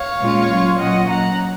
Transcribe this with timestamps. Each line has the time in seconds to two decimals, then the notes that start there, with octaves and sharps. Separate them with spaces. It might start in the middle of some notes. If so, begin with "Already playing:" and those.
Already playing: C#5 F5
0.20 A#2 G#3 C#4 F4
0.50 F#3 C#4 F4
0.79 A#2 F#3 C#4 F4 D#5 F#5
1.08 F#3 A#3 C#4 F#5 A#5